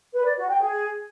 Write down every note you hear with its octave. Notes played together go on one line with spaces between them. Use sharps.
B4
D5
F#4
G5
G#4